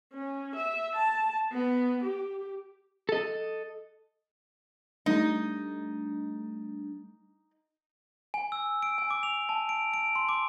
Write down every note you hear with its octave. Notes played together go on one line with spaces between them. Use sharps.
C#4
E5
A5
B3
G4
A4 D#5
G3 A3 D4 D#4
G#5
E6
D7
G#5
D6
F7
A5
D7
D7
C6
D6